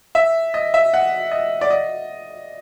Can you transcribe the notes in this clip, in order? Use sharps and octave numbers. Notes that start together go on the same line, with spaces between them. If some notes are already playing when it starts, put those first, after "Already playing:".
E5
D#5
E5
F#5
D#5
D5
D#5